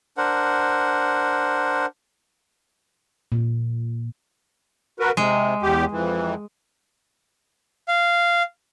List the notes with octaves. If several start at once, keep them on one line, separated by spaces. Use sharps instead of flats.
D4 A#4 C5 F#5
A#2
F#4 A#4 B4
C3 G#3
E2 G4
F2 E3
F5